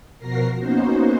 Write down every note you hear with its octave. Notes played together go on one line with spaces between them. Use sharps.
B2 F3 F#4 A#4 A#6 C7
A#3 B3 C#4 D#4 F#4 C5